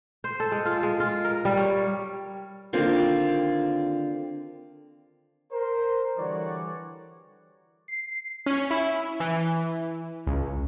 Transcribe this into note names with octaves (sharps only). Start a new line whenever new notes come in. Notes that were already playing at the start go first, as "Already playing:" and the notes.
C5
A4
G#3
F4
G#3
F4
A#4
G3
C#5
D3 D#3 A#3 C4 F4 G4
A#4 C5
D3 E3 G3 F#4 C#5 D5
C7
C#4
E4
E3
C#2